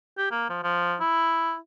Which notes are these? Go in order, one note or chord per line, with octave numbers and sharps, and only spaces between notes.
G4
A#3
F3
F3
E4